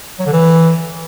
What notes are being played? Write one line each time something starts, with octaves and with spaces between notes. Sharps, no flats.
F#3
D3
E3